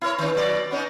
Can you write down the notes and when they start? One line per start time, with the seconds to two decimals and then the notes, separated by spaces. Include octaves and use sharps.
0.01 E4 A#4 C#5
0.18 D#3 C#4
0.35 B2 F#3 D5
0.71 B3 C#4 D#4